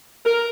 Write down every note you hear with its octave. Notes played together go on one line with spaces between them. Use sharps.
A#4